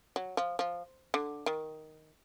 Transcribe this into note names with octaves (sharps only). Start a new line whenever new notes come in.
F#3
F3
F3
D3
D#3